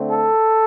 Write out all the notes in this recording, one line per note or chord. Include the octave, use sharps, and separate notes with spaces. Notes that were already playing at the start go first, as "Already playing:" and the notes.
Already playing: D3 A3 C4
A4